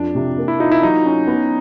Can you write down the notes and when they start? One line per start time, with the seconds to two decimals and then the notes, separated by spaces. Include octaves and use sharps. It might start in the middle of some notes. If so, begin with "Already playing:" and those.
Already playing: F2 F3 D4
0.15 C3
0.38 A#3
0.48 E4
0.60 D#4 F4
0.72 E4
0.83 F#3 D#4
1.05 C#4
1.27 B3